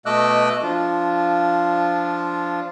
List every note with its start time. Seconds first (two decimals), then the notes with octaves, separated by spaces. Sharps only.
0.06 B2 A3 D#5 D6 E6 F#6
0.63 F3 D4 F4